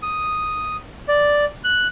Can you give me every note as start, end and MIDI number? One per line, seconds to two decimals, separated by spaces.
0.02 0.76 87
1.08 1.45 74
1.64 1.87 90